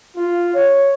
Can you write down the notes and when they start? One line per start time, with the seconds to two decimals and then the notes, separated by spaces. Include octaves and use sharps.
0.16 F4
0.54 C#5